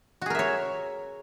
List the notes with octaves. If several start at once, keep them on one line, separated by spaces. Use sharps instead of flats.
F#4 G#4 A#4 C#5 E5